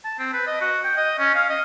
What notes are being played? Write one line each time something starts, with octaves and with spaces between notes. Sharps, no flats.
A5
C4
B4
D#5
F#4
G5
D#5
C#4
F5
D#5